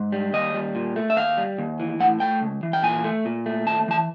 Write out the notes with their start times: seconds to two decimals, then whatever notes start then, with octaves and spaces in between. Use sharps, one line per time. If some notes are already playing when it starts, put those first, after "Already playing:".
Already playing: G#2
0.12 G3
0.33 D#2 D#5
0.54 G3
0.75 A#2
0.96 A3
1.10 E5
1.17 D#2 F5
1.37 G3
1.58 D#2
1.80 E3
2.00 A2 F#5
2.20 A3 G5
2.42 C#2
2.63 E3
2.73 G5
2.83 A#2 G#5
3.04 A3
3.25 A#2
3.46 A3
3.66 D#2 A5
3.88 E3 A5